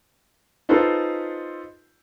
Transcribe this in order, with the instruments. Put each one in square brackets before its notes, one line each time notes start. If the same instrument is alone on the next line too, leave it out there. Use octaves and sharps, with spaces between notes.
[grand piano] D#4 F4 G#4 A4 B4 C5